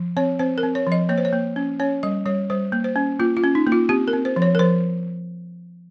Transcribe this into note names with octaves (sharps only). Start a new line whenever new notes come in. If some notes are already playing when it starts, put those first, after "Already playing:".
Already playing: F3
C4 C#5
C4 C5
A#4
C4
C#5
F3
D#5
A#3 C#5
C5
C#5
A#3
C#4
C#4 C#5
G3 D#5
G3 C#5
G3 C5
A#3
C5
C#4
A#3 F4
F4
C#4
D#4
A#3
F4
C4 G4
A#4
C4
C5
F3
C#5
A#4
F3 C5